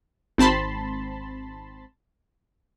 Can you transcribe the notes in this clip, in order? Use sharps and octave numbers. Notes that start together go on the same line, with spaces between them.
G#1 C4 A5 B5 C6